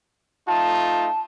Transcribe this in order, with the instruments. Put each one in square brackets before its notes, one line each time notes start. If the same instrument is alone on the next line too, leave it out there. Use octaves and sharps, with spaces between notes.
[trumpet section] A3 D#4 F4 [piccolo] A5